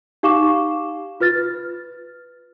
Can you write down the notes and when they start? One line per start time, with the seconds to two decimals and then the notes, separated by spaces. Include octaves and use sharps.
0.23 D#4 G4 F5 C#6 D6 E7
1.20 F4 B4 F6 A6